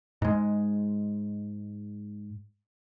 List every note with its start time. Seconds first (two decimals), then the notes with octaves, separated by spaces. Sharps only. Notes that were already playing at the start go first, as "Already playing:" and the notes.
0.22 G#2 G#3